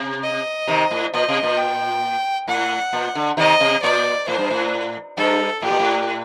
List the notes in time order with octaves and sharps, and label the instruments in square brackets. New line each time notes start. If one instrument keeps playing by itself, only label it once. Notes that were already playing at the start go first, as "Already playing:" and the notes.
Already playing: [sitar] C3
[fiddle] D#5
[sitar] C3 D#3
A2
[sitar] A#2 [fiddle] D#5
[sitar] C3
A#2
[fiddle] G5
[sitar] A2 [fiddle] F#5
[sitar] A#2
D3
[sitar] C3 D#3 [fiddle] D#5
[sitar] C3
[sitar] A#2 [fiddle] D5
[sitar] A2 [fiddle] C5
[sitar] G2
A2
[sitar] G2 [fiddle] A4
[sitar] A2 [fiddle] G4
[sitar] A#2
A2